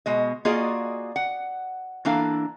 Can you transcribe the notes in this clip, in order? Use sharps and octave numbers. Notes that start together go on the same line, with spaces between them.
B2 G#3 D#5
A#3 F4 F#4 G#4 D5 D#5
F#5
E3 A#3 D4 A4 F5